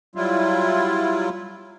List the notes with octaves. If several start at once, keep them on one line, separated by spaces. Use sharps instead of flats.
F#3 G3 E4 F4